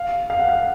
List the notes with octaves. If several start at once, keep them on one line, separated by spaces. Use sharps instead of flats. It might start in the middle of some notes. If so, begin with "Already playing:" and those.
Already playing: F5
F5
F#5
F5